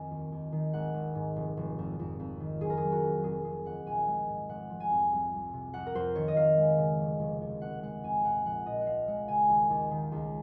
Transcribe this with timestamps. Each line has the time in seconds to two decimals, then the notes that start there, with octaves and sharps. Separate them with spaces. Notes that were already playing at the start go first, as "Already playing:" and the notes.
Already playing: F2 D#3 G#5
0.11 D#2
0.32 D#2
0.52 D#3
0.73 G#1 F#5
0.94 G#1
1.15 G#2
1.36 F1
1.57 F1
1.78 F2
1.99 F2
2.19 F2
2.40 D#3
2.60 F#1 G#4
2.70 A#4
2.77 F#3 G#4
2.92 F#4
3.03 F2
3.24 F1 G#4
3.44 F1 G#4
3.65 D#2 F#5
3.86 A#1 G#5
4.07 G#3
4.28 G#2
4.49 F1 F#5
4.70 F3
4.80 G#5
4.91 F2
5.11 C2
5.33 C2
5.53 C3
5.74 F2 F#5
5.86 A#4
5.95 F2 C5
6.15 D#3 C#5
6.28 D#5
6.36 F2 F5
6.57 G#3
6.78 C#3
6.99 F1
7.20 F1
7.41 D#2
7.62 F1 F#5
7.83 G#3 F#5
8.03 F2 G#5
8.24 A#1 F#5
8.45 A#1 F#5
8.66 A#2 D#5
8.81 F#5
8.87 C#2 F5
9.08 G#3 F#5
9.28 C#3 G#5
9.50 D#2
9.70 D#2
9.91 D#3
10.12 C#2